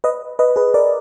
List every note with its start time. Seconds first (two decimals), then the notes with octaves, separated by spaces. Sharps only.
0.04 B4 D#5
0.39 B4 D#5
0.56 G#4 B4
0.74 A#4 D5